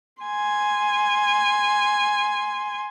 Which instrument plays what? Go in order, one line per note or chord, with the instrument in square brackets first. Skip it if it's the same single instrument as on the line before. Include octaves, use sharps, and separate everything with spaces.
[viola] G#5 C6